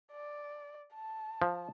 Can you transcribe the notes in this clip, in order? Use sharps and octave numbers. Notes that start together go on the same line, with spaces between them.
D5
A5
F3